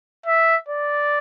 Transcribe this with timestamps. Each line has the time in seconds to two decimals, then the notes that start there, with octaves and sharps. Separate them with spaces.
0.26 E5
0.69 D5